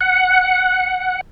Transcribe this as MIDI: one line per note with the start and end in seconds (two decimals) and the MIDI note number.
0.01 1.21 78